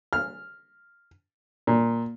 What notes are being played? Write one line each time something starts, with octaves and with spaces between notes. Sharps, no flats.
F6
A#2